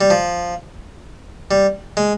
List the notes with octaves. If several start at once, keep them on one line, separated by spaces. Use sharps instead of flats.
G3
F3
G3
G#3